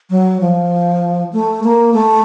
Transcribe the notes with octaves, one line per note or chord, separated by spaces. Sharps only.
F#3
F3
A3
A#3
A3